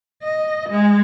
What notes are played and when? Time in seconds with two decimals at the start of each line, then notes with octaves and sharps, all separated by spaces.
0.23 D#5
0.69 G#3